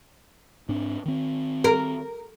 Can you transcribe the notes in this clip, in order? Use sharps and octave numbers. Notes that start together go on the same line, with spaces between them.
G#2 C4 D4
D#3 C4
A#4